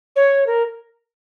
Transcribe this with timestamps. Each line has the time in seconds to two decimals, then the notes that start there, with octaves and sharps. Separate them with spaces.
0.16 C#5
0.47 A#4